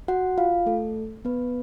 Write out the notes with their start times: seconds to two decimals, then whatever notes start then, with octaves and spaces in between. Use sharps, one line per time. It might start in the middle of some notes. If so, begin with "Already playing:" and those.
0.08 F#4 F#5
0.38 F4 F5
0.66 A3 A4
1.25 B3 B4